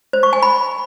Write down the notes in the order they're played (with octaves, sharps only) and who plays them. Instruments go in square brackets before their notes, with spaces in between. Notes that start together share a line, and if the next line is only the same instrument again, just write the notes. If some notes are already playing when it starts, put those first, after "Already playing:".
[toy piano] C5
C#6
G#5
B5